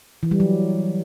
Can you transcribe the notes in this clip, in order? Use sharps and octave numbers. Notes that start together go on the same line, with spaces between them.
E3
G3
F#3